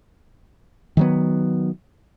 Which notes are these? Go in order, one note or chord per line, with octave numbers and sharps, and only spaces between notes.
D#3 F#3 B3